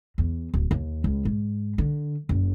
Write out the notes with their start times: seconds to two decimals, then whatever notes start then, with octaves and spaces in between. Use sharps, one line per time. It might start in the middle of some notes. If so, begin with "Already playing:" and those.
0.18 E2
0.54 D1
0.71 D#2
1.04 C#2
1.25 G#2
1.78 D3
2.29 F#1